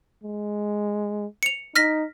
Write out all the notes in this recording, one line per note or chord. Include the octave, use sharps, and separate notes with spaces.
G#3
C#7 F7
D#4 F6 A#6 B6